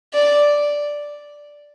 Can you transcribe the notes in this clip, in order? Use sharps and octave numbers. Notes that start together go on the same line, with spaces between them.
D5